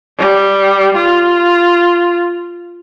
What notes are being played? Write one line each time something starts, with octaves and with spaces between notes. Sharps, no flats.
G3
F4